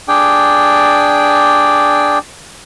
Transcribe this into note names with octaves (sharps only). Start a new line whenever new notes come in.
D4 G#4 D5 G5